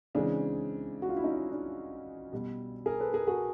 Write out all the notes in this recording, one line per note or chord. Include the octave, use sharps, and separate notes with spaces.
C#3 E3 G#3 C4 D4
F#4
F4
E4
C#4 D#4
D4 E4
B2 G3
G#4 A#4
A4 B4
G#4 A#4
F#4 G#4